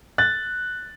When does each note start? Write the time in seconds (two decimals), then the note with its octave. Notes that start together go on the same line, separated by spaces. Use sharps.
0.18 F#6 A6